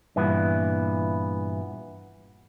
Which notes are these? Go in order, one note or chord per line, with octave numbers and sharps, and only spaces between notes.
G2 A#2 E3 B3